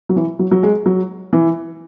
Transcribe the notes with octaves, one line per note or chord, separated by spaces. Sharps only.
F#3
E3
F#3
F#3
G#3
F#3
E3